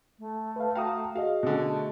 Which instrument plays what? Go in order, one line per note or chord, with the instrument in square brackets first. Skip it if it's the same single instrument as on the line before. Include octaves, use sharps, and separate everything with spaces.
[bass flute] A3
[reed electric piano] B4 F5
[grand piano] F#4 F5 [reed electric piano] G5 A#5 D#6
[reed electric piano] F#4 G#4 D#5 [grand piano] F5
[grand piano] B2 D3 [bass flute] C#4
[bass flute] A3